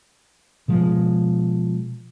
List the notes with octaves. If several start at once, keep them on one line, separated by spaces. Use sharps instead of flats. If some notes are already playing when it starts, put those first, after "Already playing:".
B2 F3 G#3